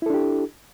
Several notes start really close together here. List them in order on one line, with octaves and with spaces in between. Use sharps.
E4 A4 D4 G4